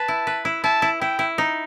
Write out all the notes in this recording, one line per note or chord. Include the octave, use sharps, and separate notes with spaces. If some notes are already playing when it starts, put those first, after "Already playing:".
Already playing: B4 A5
E4
B4
E4
E4 A5
E4
E4 G5
E4
D#4